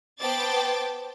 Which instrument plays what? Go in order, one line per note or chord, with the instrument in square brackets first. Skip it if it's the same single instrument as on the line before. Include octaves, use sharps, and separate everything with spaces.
[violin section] B3 C5 G5 A5 D6 A6